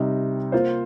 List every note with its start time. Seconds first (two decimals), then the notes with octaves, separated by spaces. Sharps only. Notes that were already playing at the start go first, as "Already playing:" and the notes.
Already playing: C3 G3 D#4
0.52 A#3 F4 C5